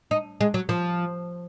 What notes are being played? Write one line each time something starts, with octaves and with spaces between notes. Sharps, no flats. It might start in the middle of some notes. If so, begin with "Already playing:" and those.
D#4
G#3
F#3
F3